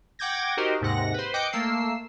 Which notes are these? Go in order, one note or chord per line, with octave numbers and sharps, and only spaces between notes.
F#5 G5 D6 G6 G#6 A#6
D#4 F#4 G4 A#4 C5 D#5
D#2 G#2 C3 F#5 A#6
B4 C5
D#5 G5 D6 F#6 G6 C#7
A3 A#3 E6 C7